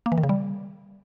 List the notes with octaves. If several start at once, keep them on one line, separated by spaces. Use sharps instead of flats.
A#3
E3
D#3
C#3
G3